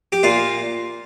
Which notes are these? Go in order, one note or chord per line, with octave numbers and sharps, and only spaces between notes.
G4
A#2 F4